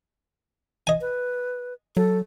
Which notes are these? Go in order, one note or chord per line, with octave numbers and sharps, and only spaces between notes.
D#5 G#5
B4
F#3 A4